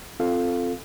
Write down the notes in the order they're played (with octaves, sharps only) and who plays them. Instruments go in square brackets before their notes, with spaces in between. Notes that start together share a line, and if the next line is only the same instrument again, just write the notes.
[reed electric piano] C4 F4 A4 F5